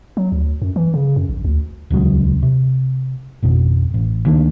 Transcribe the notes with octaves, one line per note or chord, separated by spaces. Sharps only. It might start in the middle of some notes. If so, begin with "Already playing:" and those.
F#3
D2
F#2
E3
C#3
F#2
A#1
D2
D#1 C#2 F#3 G#3
C3
G#1 F2 B2
A1
D2 D#3 A#3 D4